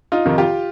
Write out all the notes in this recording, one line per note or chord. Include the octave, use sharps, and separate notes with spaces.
D#4 F4
F2 C3 D#3
F4 G4